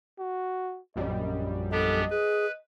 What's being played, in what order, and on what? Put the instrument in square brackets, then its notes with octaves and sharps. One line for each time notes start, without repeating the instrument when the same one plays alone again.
[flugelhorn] F#4
[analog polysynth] A#1 F#2 G3 [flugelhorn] D#5
[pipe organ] B3 D4 G4 [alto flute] A4 [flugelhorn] D#5
[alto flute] G#4 [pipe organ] B4